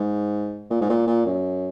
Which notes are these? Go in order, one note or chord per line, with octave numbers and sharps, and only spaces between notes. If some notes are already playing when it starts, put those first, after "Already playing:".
Already playing: G#2
A#2
G#2
A#2
A#2
F#2